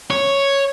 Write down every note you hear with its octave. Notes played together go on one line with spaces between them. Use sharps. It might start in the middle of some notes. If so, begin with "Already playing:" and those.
C#5